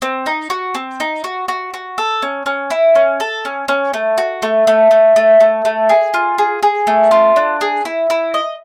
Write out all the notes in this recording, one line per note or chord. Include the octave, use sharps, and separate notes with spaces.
C4
D#4
F#4
C4
D#4
F#4
F#4
F#4
A4
C#4
C#4
E4
C#4
A4
C#4
C#4
A3
F#4
A3
A3
A3
A3
A3
A3
G#4
F4
G#4
G#4
A3
F4
D4
G#4
E4
E4
D#5